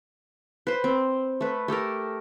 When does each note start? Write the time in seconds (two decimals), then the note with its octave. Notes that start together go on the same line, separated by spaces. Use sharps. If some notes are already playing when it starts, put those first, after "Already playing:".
0.67 B4 C5
0.84 C4
1.41 A3 B4
1.68 A3 G4 A4 A#4